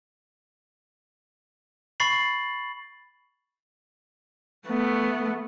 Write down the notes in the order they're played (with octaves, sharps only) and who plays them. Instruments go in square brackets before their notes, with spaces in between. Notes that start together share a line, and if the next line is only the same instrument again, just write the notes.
[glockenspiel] B5 C#6 A6 C7 F#7
[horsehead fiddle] A3 B3